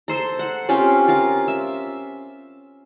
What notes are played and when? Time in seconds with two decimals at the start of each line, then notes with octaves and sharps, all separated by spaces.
0.08 A4 C5 A#5
0.39 F#5
0.69 C4 C#4 F4 G4
1.08 F4 A#4 F5
1.48 E5